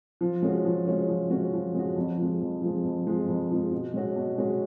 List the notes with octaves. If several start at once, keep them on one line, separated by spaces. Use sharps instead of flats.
F3
G#3 C#4 F#4
F3
G#3 C#4 F#4
F3
G#3 C#4 F#4
F3
G#3 C#4 F#4
F2
F3 G#3
F2
F3 G#3
F2
F3 G#3
F2
F3 G#3
B2
G#3 C#4 F#4
B2
G#3 C#4 F#4